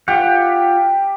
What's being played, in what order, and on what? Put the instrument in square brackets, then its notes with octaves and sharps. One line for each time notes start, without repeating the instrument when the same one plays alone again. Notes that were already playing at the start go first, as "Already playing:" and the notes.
[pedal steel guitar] F4 F#5 [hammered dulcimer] G4